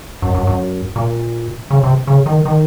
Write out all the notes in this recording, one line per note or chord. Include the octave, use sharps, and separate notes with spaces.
F#2
F#2
F#2
A#2
C#3
C3
C#3
D#3
D#3